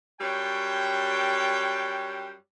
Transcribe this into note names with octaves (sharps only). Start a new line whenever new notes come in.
F#2 G3 C#5 G5